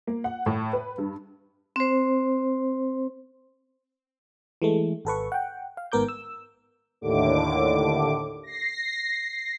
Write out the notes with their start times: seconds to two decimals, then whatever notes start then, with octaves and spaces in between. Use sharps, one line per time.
0.07 A#3
0.24 F#5
0.46 A2
0.73 B4
0.98 G2
1.76 C4 C5
4.62 E3 G#3 A3
5.05 G#1 A4 B4 C#6
5.32 F#5 G5
5.77 F5
5.92 G#1 G#2 B3 A#4 D6 G6
6.08 E6
7.01 D#2 A2 D3 D6
8.43 A#6 C7